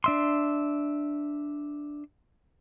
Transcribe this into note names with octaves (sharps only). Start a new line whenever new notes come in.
D4 E5 C6